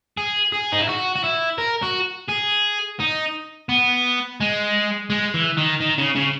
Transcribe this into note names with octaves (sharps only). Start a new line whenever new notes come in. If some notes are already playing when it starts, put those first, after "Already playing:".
G#4
G#4
D#4
E4
F#4
F#4
E4
A#4
F#4
G#4
D#4
B3
G#3
G#3
E3
D#3
D#3
C#3
C#3